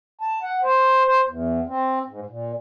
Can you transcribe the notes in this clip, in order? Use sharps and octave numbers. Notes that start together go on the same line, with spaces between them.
A5
F#5
C5
C5
E2
C4
G#2
A#2